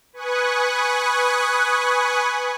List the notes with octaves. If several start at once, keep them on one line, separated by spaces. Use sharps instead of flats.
B4 G#5 C#6 D#6 F#6